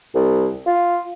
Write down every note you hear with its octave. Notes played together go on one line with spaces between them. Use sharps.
C2
F4